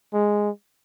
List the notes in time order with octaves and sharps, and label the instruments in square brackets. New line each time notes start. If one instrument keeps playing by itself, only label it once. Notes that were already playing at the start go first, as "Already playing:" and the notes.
[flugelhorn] G#3